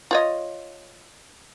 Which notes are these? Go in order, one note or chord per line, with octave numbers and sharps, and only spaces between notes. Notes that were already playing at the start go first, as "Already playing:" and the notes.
F4 C#5 D#5